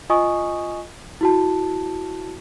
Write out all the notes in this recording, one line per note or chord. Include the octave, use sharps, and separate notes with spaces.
F4 D#5 G#5 C#6 D#6
E4 F#4 A5